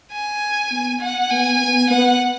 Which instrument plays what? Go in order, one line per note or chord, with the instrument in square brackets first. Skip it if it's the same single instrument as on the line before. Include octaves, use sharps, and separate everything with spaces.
[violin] G#5
[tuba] B3
[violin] F#5
[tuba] B3 [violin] G#5
[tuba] B3
[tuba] B3 [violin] F#5